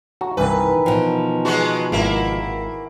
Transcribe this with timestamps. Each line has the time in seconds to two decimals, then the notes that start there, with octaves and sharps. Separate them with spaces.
0.21 F#4 A#5
0.37 C2 G2 D#3 E3 B4
0.86 B2 F3 G5
1.45 G#3 B3 F#4 C6 C#6
1.92 G#1 A#3 E4 F#5 B5